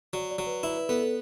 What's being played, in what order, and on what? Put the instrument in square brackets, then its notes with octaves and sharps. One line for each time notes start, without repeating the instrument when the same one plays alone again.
[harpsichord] F#3 [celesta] D5
[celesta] D5
[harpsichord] F#3
[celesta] B4
[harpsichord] E4 [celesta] B4
[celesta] B4
[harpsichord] B3 [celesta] A4
[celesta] A4